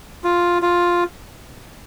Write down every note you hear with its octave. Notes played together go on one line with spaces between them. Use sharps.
F4
F4